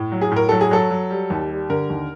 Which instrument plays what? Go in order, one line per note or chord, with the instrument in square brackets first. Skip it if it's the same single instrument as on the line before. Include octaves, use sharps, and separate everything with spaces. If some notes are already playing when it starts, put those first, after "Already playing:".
Already playing: [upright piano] A2
F#3
G#4
A2 A#4
F#3 A4
G#4
F#3 A4
F#3
G3
D#2
G3
D3 A#4
D#2